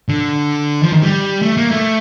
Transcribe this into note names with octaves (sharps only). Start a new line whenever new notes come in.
D3
F3
D#3
G3
A3
A#3
A3